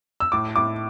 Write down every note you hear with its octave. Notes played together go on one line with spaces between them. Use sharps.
E6
A2 D6
A2 D6